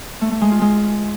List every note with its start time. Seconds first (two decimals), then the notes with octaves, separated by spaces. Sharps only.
0.21 A3
0.31 A3
0.41 G#3
0.51 F4
0.61 G#3